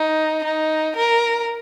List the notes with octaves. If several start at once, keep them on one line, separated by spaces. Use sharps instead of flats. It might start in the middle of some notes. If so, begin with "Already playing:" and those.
Already playing: D#4
D#4
A#4